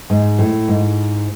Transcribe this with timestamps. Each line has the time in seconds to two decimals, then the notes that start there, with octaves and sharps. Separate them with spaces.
0.10 G#2
0.39 A2
0.68 G#2